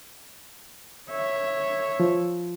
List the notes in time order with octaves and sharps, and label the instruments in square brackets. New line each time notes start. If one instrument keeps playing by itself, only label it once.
[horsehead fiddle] C#5 E5
[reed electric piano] F3